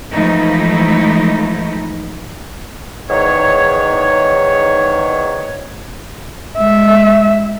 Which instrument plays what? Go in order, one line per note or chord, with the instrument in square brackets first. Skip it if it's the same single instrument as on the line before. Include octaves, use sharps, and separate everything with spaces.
[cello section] E3 F3 G#3 A3 D#4 E4
[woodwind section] E2 G#2 D#3 C#5
[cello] G#3 E5